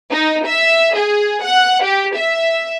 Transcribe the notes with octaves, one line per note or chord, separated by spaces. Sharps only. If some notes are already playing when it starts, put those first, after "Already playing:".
D#4
E5
G#4
F#5
G4
E5